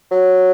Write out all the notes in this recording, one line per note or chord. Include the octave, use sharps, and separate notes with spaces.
F#3